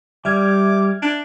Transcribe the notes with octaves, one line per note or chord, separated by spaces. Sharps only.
G3 E5 D6 F6 G#6
D4